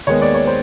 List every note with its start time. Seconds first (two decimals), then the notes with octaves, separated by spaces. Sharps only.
0.07 D#2 D#3 G#3 B3 C#5
0.22 D5
0.34 C#5
0.47 C5